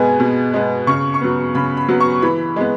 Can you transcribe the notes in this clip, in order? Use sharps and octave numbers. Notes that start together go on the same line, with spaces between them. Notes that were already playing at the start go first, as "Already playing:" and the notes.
Already playing: B2 G#3 B3 G#5
B2
G#3 B3
C#3 C#6
C#6
F#3 B3
C#3 B5
B5
F#3 B3
C#6
E3 B5
G#3 B3